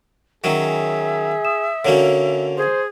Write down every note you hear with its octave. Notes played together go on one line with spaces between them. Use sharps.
D#3 F#3 C#4 G#4 E5
D#6 E7
D3 A#3 C#4 F#4 C#5
G#4 C5